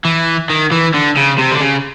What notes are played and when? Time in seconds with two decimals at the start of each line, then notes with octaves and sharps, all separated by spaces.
0.05 E3
0.50 D#3
0.72 E3
0.94 D3
1.16 C#3
1.38 C3
1.51 D3
1.60 C#3